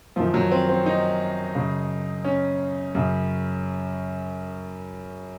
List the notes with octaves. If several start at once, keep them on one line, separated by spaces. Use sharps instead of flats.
F#2 D#3 F3
F#3
C4
C4
D#4
F#2 C#3
C#4
F#2 C#3